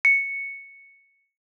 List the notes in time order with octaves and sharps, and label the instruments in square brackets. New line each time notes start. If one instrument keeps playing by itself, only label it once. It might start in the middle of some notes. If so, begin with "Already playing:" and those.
[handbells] C#7